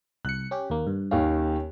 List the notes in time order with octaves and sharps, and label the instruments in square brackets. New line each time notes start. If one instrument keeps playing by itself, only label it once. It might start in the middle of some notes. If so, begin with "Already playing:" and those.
[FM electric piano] C2 C#7 [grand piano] F#6
[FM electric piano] C#4 G4
D#2 A#3
G2
[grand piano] D#2 D#3 F5 [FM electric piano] C#4